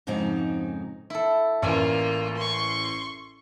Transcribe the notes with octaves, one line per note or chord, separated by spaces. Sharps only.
F2 G#2 C#3 F3 C4 D#4
E4 A4
A1 A#3 F4 C#5 D5 G#5
C6 C#6